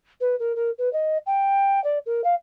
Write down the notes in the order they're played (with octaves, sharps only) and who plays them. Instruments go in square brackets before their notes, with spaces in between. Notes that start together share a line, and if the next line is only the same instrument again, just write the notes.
[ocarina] B4
A#4
A#4
B4
D#5
G5
D5
A#4
F5